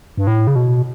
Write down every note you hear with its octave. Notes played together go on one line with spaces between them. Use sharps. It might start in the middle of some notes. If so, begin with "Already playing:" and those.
G2
A2
C#3
B2